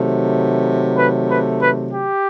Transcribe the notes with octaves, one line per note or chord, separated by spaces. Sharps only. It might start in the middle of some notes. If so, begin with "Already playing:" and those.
Already playing: C3 D#3 F#3 A3
B4
B4
B4
G4